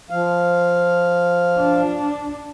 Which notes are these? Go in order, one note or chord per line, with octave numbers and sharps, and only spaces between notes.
F3 F5
D4